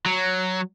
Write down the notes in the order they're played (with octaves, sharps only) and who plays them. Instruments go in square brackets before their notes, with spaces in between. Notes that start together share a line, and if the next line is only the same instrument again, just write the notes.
[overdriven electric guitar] F#3